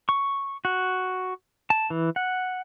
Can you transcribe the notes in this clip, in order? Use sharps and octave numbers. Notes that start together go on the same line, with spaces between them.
C#6
F#4
A5
E3
F#5